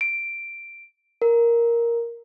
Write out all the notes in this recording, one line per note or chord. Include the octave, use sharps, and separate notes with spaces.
D7
A#4